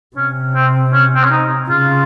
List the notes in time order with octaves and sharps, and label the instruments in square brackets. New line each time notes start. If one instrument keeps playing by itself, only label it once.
[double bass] C3 [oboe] C#4
[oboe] C4
C#4
C4
C#4
D#4
[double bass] C#3 [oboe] F4